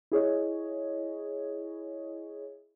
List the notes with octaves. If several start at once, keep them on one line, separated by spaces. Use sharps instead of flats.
E4 G#4 C#5 D#5